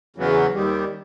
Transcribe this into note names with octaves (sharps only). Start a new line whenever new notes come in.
E2 C#3 F#3 B3
D#2 D#3 G3